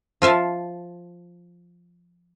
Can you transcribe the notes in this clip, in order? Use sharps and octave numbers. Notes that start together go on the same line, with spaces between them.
F3 F4 E5 A5